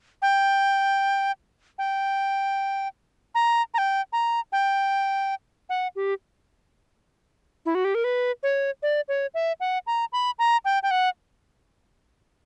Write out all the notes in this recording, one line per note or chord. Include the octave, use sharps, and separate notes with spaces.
G5
G5
A#5
A#5
G5
A#5
G5
F#5
G4
E4
F#4
G4
A#4
B4
C#5
D5
C#5
E5
F#5
A#5
B5
A#5
G5
G5
F#5